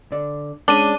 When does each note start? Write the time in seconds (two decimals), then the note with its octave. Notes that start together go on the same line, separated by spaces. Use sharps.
0.12 D3 D5
0.68 G#3 C#4 D4 D6 D#7